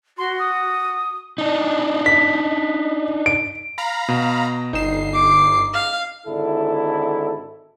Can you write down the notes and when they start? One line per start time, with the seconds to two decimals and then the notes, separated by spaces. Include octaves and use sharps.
0.18 F#4 C6
0.39 D#6
1.38 D4 D#4
2.06 B6
3.26 D7
3.78 F5 A#5 B5
4.08 B2
4.73 G1 D#4 C7 E7
5.13 D6
5.73 F5
6.26 G#1 D3 E4 A4